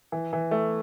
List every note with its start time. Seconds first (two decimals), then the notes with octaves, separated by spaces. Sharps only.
0.12 E3
0.33 E3
0.51 A3